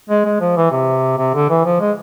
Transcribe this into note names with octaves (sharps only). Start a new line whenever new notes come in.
G#3
G#3
F3
E3
C3
C3
D3
E3
F3
G#3